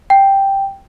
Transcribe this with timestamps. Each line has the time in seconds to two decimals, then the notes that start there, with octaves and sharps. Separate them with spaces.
0.10 G5